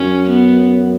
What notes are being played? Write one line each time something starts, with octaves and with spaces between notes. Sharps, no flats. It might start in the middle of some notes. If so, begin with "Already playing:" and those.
Already playing: F#2 C#4
B3